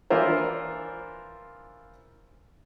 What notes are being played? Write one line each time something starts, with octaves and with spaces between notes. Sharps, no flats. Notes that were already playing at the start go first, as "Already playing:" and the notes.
E3 D4 E4 F4 A#4 C5